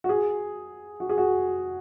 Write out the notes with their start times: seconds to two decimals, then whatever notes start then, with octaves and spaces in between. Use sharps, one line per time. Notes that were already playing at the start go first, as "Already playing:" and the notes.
0.04 F#4
0.09 G#4
1.00 F#4
1.09 G#4
1.18 F#4